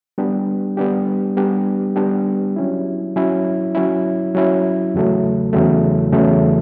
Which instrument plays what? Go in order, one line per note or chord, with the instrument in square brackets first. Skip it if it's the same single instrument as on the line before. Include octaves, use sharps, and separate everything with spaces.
[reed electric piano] G3 B3 D4 G4
G3 B3 D4 G4
G3 B3 D4 G4
G3 B3 D4 G4
F#3 C#4 E4
F#3 C#4 E4
F#3 C#4 E4
F#3 C#4 E4
E2 C#3 F#3 A3
E2 C#3 F#3 A3
E2 C#3 F#3 A3